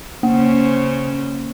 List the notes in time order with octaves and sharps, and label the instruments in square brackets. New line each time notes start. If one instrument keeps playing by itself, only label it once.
[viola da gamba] C#3 C#4 C5 [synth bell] A#3